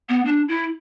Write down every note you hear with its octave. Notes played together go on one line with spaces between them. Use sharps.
B3
D4
E4